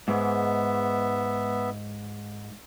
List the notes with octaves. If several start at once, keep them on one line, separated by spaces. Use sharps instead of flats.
G#2 B3 E5